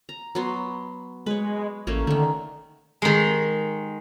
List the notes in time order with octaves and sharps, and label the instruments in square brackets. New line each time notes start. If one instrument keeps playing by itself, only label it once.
[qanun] A#5
F#3 B3 C6
[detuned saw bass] G#3 [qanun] B4 C#5
[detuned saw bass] A1 [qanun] A3 A#3 C#4
[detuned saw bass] D3 [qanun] D#3 A3
[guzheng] D#3 G#3